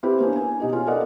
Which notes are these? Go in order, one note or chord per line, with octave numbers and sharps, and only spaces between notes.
C4 E4 G4 B4
A#3 B3 C#4 D4
G#5
B2 D#4 G4
C#4 F4 G#4
B3 A4 A#4 D5 D#5 F#5